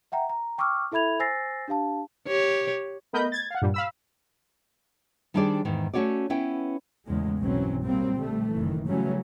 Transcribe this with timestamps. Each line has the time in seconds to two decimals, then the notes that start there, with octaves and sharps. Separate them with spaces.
0.12 E5 F#5 G5 A#5
0.29 A#5
0.58 G5 C#6 D6 E6 F6
0.92 E4 A4 E5 B5 G#6 F7
1.20 C5 G#5 E6 A6 A#6 C7
1.68 D4 G4 F5 A5
2.27 G4 C#5
3.13 A3 B3 A#4 D#5 B5 G6
3.32 G#6 A6
3.51 F5 F#5
3.62 G2 A#2 G3
3.74 F5 B5 E6
5.34 D#3 G3 D4 G#4 C5 D5
5.65 E2 G#2 D#3
5.94 A3 C#4 F#4 C#5 D5
6.30 B3 C#4 E4 G5
7.05 E2 A2 C#3 G#3
7.40 B1 G2 E3 F#3 C4 C#4
7.84 A#2 F#3 G3 A#3 C4
8.13 D3 G3 A3
8.53 F#1 D#3 E3
8.87 C#3 E3 F#3 G3 A3 C#4